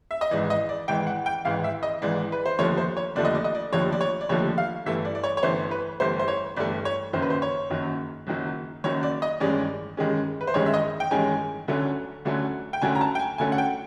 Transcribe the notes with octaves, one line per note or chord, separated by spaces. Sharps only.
E5
D#5
G#1 G#2 E3 D5
D#5
D5
G#1 G#2 E3 G5
F#5
G5
G#1 G#2 E3 F5
E5
D#5
G#1 G#2 E3 D5
B4
C5
F1 D#2 D3 F3 A3 C#5
C5
C#5
F1 D#2 D3 F3 A3 D5
D#5
D5
D#5
D5
F1 D#2 D3 F3 A3 C#5
D5
C#5
D5
F1 D#2 D3 F3 A3 C#5
F5
G1 G2 E3 A3 E5
D5
D5
C#5
C#5
G1 G2 E3 A3 C5
B4
G1 G2 E3 A3 C5
C5
C#5
G1 G2 E3 A3 D5
C#5
F#1 F#2 D#3 F#3 C5
B4
C5
C#5
F#1 F#2 D#3 F#3
F#1 F#2 D#3 F#3
F#1 F#2 D#3 F#3 C#5
D5
D#5
A1 G2 D#3 G#3 C#4 D5
A1 G2 D#3 G#3 C#4
B4
C5
A1 G2 D#3 G#3 C#4 C#5
E5
D#5
G5
A1 G2 D#3 G#3 C#4 G#5
D2 D3 F#3 A3 C#4
D2 D3 F#3 A3 C#4
G5
D2 D3 F#3 A3 C#4 G#5
A#5
A5
G5
G#5
D2 D3 F#3 A3 C#4 G#5
F#5
G5